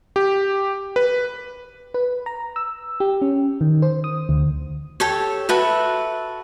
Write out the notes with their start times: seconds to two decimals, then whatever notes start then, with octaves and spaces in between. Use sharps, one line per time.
0.16 G4
0.96 B4
1.94 B4
2.26 A#5
2.56 E6
3.00 G4
3.22 C#4
3.61 D#3
3.82 C5
4.04 D#6
4.29 D2
5.00 G4 A4 C#5
5.49 F#4 A4 B4 E5